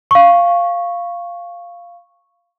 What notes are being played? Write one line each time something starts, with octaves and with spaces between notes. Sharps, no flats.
F5 C#6